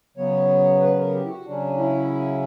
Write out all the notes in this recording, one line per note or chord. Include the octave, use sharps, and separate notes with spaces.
C#3 F#3 B3 C#5
B4
A#4
G4
E4
F#4
C#3 F#3 C#4 D4
E4